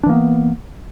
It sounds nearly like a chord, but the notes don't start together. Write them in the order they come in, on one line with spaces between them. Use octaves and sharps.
D4 E3 A#3 B3